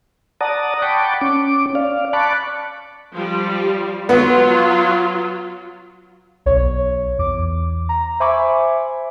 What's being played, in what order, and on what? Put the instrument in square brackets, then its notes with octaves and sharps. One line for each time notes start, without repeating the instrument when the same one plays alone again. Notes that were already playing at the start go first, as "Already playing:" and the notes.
[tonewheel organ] D5 F#5 A5 A#5 D#6
F#5 G5 A5 B5 C#6 D6
C#4 D6
D5 F5
A5 B5 C#6 D6 F#6
[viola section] F3 G3
[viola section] F#3 F4 [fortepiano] B3
[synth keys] B1 C#5
E2 D6
A#5
C5 E5 G#5 B5 C#6 D6